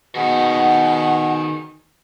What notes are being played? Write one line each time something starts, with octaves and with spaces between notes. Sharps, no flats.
B2 D#3 F#4 G#4 F#5